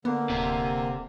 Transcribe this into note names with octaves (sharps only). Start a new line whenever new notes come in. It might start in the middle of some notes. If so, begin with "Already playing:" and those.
D3 A#3 B3
D1 C3